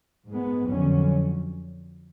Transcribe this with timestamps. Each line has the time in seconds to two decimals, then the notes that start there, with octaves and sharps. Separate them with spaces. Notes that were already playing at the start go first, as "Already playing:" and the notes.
0.29 G#2 G#3 B3
0.70 F2 D3 F#3 C#4